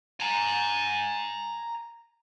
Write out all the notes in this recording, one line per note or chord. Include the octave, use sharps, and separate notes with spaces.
G#5 A#5